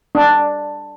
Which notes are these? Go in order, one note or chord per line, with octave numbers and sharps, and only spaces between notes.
D4